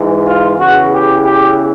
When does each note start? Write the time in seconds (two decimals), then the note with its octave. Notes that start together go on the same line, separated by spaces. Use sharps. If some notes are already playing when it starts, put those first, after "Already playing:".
Already playing: G#2 E3
0.24 F4
0.57 E2 C#3 E3 F#4
0.90 G4
1.23 G4